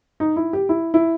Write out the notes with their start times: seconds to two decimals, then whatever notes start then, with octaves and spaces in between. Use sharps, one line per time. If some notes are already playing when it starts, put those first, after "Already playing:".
0.20 D#4
0.36 E4
0.53 G4
0.69 E4
0.94 E4